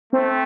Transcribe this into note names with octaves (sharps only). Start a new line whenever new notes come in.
A3 C4